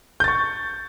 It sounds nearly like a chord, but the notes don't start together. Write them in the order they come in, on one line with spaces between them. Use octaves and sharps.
G6 A6 C#6